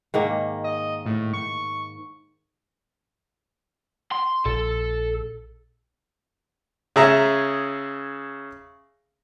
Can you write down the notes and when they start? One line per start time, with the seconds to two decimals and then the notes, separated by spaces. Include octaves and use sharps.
0.14 G#2 D#3 A#3
0.64 D#5
1.06 A2
1.34 C#6
4.11 C6
4.46 A#1 A#2 A4
6.96 C#3 G#4 E5 A#5 C#6